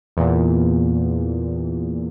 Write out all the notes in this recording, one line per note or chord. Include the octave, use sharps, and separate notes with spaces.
E2 A#2